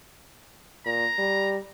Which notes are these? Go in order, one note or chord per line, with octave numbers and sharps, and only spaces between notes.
A#2 A#5
G3